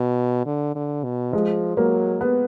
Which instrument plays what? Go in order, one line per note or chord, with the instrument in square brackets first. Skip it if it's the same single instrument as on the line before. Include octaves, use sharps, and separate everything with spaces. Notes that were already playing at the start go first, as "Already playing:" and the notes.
Already playing: [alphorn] B2
D3
D3
B2
[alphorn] F3 [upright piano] G#3
[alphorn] F#3 [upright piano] A#3
[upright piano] B3